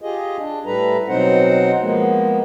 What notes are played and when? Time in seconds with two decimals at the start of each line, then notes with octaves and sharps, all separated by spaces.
0.02 F4 G4 G#4 D#5
0.38 D4
0.66 A2 G3 A4 B4 A#5
1.08 B2 F#3 C4 D#4 C5 F#5
1.81 F3 G#3 A#3 B3